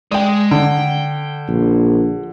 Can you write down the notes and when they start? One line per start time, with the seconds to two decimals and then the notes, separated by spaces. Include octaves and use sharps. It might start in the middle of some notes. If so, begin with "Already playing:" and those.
0.11 G#3 D5 G5
0.51 D3 G5
1.48 A#1